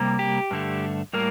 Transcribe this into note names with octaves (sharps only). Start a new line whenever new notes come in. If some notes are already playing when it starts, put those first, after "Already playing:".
Already playing: C3 G3 A#3
G4
G2 D3 A3
A2 G3 A#3 A#4